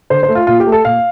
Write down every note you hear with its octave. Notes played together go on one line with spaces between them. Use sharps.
D3 C5
C5
A3
F4
A#2 F4
G4
A3
A4
A#2 F5